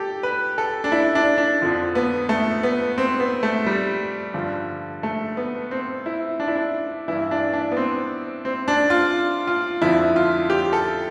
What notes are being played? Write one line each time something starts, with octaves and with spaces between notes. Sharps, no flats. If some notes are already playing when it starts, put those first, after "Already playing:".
Already playing: G4 A4
B4
A4
D4
E4
D4
D4
F2 D3 F3
B3
A3
B3
C4
B3
A3
G3
G2 D3 F3
A3
B3
C4
E4
D4
E4
D4
G2 E3 E4
D4
D4
B3
C4
C4
D4
F4
F4
F2 D3 F3 E4
F4
G4
A4